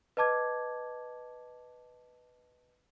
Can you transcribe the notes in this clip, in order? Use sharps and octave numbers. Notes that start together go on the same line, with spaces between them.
B4 D#5 A5 D6 G#6